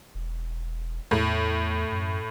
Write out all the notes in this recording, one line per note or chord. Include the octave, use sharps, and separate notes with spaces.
E1
E2 A2
F#2